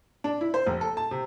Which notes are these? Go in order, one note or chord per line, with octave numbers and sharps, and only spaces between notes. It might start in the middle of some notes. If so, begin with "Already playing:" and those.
D4
E4
C5
F1
A4
A5
C3